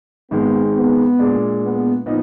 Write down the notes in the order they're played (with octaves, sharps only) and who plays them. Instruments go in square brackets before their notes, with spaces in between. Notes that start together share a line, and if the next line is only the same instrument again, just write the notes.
[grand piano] G#1 G#2 D#3 G#3 [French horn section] B3
[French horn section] B3
[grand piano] A#2 G#3 D4
[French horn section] B3
[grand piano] A#2 F3 B3 D#4